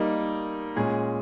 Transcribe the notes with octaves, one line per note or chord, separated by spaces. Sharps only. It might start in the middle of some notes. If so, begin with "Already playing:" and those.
Already playing: G3 A#3 D#4 A#4
A#2 G#3 C#4 G#4